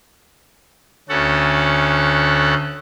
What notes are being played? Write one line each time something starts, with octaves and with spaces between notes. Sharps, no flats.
D2 C#4 A4 F#5